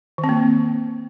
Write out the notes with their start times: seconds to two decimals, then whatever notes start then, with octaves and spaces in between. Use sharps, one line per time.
0.18 D#3
0.24 C4
0.29 A#3